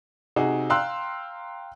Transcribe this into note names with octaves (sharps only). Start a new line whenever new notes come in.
C3 D#4 F#4 G#4
F5 G5 A#5 C6 E6 F#6